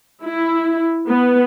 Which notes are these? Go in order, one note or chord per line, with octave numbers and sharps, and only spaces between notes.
E4
B3